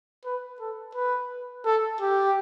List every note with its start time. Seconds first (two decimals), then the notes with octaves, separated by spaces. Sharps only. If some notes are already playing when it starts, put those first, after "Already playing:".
0.25 B4
0.60 A4
0.95 B4
1.66 A4
2.01 G4